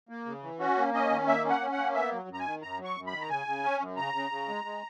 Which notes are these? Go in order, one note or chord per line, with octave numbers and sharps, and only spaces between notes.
A#3
C#3
E3
C#4 F#4
A#3
C#4 D#5
D#3
A#3 E5
C#4
F#5
C#4
F#5
A#3
B3 E5
F#3
F#2
A#5
G#5
D#3
F#2 A#5
F#3
C#6
F#2
B5
D#3
A#5
C#3 G#5
C#3
C#4
F#2
C#3 A#5
C#3
C#3
G#3
G#3